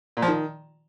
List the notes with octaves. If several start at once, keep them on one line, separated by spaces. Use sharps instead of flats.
A#2
F3
D#3